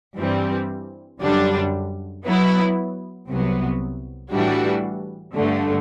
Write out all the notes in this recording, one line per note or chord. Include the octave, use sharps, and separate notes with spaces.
G2 E3 G3 C4
F#2 D3 G3 D4
F#3 B3 E4
C2 C3 F#3 B3
A2 E3 G3 D4 F#4
G2 D3 A3